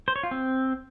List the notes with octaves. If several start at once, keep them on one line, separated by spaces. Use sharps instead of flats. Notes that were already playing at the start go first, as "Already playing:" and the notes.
C5
C#5
F4
C4